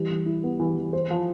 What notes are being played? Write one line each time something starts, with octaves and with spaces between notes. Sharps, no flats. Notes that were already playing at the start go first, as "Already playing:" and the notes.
Already playing: E3 G3
E3
E4
B3
E3
E3
C5
F3